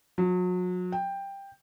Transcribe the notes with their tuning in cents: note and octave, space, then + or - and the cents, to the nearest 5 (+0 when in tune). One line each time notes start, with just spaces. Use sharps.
F#3 -35
G5 +10